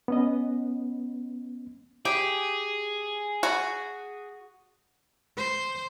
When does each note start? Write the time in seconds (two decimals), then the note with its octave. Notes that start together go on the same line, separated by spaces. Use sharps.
0.08 B3 C#4 D#5
2.05 G4 G#4
3.43 F#4
5.37 C5